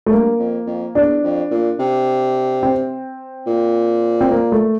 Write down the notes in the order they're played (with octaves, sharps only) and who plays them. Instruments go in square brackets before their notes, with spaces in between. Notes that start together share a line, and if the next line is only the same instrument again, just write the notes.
[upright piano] A3
[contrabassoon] G2 [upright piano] A#3
[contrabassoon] F2
F2
[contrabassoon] E2 [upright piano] D4
[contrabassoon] F2
A#2
C3
[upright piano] C4
[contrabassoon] A#2
[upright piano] C4
A#3
A3